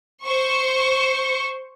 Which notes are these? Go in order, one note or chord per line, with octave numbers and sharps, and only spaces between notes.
C5 C#6